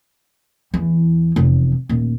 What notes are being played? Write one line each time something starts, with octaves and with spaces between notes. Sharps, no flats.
E2 E3
F1 E2
D#1